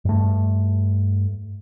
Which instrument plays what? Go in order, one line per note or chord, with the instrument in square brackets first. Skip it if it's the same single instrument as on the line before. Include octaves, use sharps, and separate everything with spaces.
[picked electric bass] G2 A3